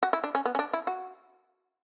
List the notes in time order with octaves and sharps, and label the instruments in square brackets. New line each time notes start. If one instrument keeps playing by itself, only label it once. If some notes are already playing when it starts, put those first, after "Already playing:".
[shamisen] F#4
E4
D4
C#4
B3
C#4
D4
E4
F#4